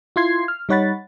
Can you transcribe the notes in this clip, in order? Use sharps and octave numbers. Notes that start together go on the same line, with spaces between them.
E4 F4 C6 G#6 C7
F6
G3 D#4 C#5 F#5 B5 A6